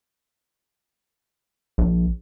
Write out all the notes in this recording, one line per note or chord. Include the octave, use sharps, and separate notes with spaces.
A#1